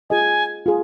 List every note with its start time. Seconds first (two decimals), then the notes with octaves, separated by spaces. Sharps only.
0.10 F4 G#4 D#5 G#5
0.66 F4 G#4